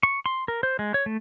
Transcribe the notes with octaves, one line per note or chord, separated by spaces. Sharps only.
C#6
C6
A#4
C5
G#3
C#5
A3